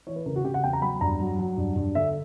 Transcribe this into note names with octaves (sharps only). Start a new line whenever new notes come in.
E3 C#5
B4
C#3 A#4
F#4
C#3 G4
F#5
E2 G5
A#5
F#3 B5
G2 A#5
F#3
F#3
G2
G2
D3 E5